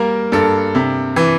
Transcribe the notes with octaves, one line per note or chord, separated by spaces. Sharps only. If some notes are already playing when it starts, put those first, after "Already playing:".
Already playing: G3 A#3 A#4
G2 A4
C3
E3